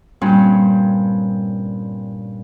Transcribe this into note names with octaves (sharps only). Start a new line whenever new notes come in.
G2 A#2 G3 C4 C#4